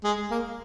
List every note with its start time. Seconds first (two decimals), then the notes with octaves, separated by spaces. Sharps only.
0.04 G#3
0.31 A#3